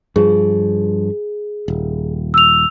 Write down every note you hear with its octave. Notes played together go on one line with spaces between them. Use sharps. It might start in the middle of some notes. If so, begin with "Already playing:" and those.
G2 F3 G#4
D#1
E6 F7